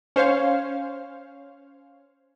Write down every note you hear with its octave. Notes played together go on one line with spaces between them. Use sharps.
C#4 C5 C#5 F5